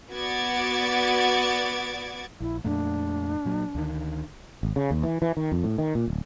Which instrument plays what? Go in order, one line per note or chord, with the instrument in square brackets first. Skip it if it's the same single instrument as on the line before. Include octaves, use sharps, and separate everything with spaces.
[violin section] B3 F#4 D5 D6 G#6 A6
[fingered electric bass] A#1 [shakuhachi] E4
[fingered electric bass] F2 A#2 A3 [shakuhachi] D4
[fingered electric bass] A#2 F#3
D2 D3 D#3
[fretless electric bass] G#1
C#3
D#2
E3
E3
D#3
F2
A2
D#3
A#2
D1